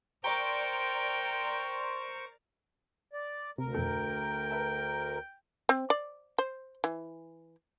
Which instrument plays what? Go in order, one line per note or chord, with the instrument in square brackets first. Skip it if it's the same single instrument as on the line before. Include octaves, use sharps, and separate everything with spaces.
[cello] A#4 [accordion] C5 C#6 [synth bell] D5 A#5 [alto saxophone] G5
[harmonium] D5
[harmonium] D2 A#4 [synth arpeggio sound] C3
[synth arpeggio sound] F2 B2 A4 [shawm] G5
[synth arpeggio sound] B4 E5 A5
[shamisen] C4
D5
C5
E3